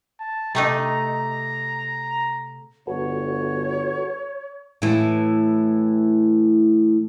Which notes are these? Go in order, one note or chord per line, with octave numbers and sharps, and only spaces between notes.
A5
C3 A3 D#4 A#5
G1 F#4 A4 B4 C#5
A2 E3